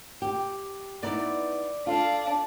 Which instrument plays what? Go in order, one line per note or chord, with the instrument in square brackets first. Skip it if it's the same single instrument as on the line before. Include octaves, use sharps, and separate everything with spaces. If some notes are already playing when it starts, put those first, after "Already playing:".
[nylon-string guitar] G4
[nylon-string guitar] B3 D#4 E4 [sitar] D5
[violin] D4 [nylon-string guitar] F4 A4 [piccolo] F5